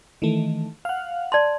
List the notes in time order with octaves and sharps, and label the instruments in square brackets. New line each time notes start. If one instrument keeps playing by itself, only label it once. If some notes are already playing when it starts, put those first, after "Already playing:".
[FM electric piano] D#3 E3 A3
F5 F#5
[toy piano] D5 A5 C6